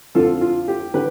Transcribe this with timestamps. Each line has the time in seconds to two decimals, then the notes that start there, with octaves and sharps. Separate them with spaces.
0.15 F2 D3 F3 F4 A4
0.41 F4
0.68 G4
0.94 D3 G4 B4